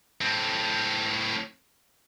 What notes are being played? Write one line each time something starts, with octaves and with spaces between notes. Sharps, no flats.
A2 C4